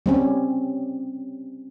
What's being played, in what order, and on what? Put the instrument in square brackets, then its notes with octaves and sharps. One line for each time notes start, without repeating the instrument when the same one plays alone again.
[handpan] G3 C4 C#4